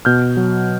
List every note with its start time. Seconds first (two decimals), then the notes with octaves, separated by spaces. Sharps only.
0.05 B2 F6 G6
0.37 F#3